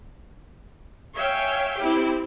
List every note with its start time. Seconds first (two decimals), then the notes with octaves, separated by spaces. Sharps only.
1.17 C#5 E5 F5 G5 G#5
1.80 C4 E4 G4